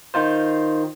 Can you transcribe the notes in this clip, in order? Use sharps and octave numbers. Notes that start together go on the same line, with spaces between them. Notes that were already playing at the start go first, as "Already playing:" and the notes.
D#3 D#4 F4 C5